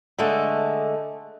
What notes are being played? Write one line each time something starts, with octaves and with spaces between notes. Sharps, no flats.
D3 G#3 A3